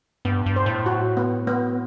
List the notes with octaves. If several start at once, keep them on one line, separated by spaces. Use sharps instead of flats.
G2 B3
G2
C5
A2
F#4
B3
B3